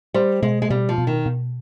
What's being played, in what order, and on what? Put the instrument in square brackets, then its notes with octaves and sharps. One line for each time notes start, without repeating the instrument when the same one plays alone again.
[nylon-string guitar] G3 [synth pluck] C5
[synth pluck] B2 [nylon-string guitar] G#3
[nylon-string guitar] G#3
[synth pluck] B2 [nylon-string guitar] G3
[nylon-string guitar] F3
[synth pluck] B2
[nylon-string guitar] D#3
[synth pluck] B2